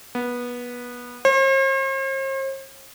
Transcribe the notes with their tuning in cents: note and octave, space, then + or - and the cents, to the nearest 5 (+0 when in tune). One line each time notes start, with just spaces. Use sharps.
B3 -20
C5 +45